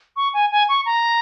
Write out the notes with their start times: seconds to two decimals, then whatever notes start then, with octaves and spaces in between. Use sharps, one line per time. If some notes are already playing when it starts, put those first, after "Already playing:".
0.16 C#6
0.34 G#5
0.51 G#5
0.69 C#6
0.86 A#5